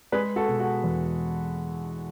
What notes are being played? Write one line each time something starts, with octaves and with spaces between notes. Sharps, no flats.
G#3 G#4 B4
F#4 A4
B2
F#4 A4
E2